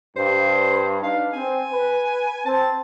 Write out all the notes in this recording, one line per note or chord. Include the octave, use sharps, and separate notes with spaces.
G2 C5
D4 D#4 B4 F5
C4 G#5
B4
C4 A5